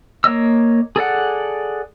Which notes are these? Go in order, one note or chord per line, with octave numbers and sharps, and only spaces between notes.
A#3 C#5 D#5 E6
G#4 A4 D5 F#5